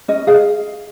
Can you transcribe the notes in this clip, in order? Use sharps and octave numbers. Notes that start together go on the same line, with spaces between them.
C#4 D#5
G#4 F5